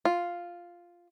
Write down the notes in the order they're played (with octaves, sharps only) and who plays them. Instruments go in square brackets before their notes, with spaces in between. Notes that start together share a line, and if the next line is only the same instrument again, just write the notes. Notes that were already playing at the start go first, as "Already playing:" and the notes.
[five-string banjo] F4